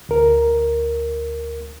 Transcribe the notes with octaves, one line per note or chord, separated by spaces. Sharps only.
D2 A#4